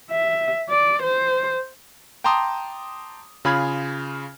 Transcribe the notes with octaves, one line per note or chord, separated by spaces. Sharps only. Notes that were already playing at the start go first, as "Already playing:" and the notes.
E5
D5
C5
G5 A5 A#5 C6 D6 D#6
C#3 F4 G#4 B5 F6 G#6